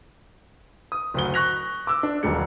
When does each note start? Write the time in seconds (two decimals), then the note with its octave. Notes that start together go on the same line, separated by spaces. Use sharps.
0.92 D#6
1.14 F#1 D2 G7
1.34 C#6 F#6 A#6 F7
1.87 D6 E6
2.03 D4
2.23 D#1 B1 D3 G#3 C#7